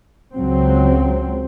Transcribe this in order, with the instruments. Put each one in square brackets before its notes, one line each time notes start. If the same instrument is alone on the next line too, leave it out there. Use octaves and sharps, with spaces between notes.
[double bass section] C#2 F#3 C4